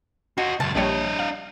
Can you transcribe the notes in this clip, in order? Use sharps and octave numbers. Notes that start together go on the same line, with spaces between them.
F4 F#4 D#5
C#2 F#2 A5
A#1 G3 D4 C#5 D#5
F5